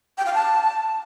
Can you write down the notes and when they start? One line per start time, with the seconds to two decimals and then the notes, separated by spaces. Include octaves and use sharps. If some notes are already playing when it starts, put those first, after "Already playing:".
0.18 G5
0.26 F5
0.34 A5